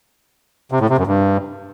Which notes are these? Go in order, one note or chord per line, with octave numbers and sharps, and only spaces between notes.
C3
A2
C3
F#2
G2